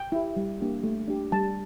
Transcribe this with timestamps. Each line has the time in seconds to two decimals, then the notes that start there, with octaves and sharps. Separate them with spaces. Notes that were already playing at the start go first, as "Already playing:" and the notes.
Already playing: G5
0.12 E4 G4
0.36 G3
0.61 A#3 D4 G4
0.83 A3
1.08 D4 G4
1.32 G3 A5